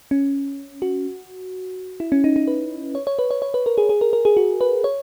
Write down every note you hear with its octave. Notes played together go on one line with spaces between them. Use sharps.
C#4
F#4
E4
C#4
D#4
D#4
B4
C#5
C#5
B4
C#5
C#5
B4
A#4
G#4
G#4
A#4
A#4
G#4
F#4
B4
C#5